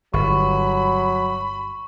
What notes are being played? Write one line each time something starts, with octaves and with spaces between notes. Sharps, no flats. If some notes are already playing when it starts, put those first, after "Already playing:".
G1 F#3 B5 C#6